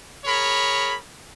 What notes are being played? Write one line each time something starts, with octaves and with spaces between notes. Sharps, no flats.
G#4 A#4 C#5 B5